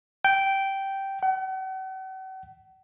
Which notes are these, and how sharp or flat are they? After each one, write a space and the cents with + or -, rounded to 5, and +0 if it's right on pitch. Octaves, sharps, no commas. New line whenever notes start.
G5 -10
F#5 +45